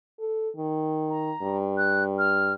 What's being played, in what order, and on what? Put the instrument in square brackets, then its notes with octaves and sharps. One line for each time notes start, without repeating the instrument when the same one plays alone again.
[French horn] A4
D#3
[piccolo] A#5
[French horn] G2
[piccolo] F#6
F6